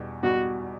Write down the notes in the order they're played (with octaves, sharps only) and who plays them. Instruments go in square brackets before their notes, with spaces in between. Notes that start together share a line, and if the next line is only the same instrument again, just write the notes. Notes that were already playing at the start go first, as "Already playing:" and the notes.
Already playing: [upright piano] E2 B2 G3
[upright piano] E2 B2 G3 [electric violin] F#4